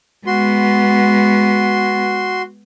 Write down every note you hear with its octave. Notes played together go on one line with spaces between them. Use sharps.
G#3 B3 F#4 C6